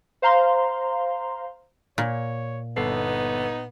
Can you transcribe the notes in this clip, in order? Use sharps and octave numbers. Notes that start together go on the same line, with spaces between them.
C5 F5 A#5 C6
A#2 C#5
G1 B3 D#4 A4 C7